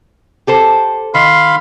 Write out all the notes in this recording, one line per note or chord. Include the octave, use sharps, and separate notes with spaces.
G4 A4 C5
D#3 F5 B5 C6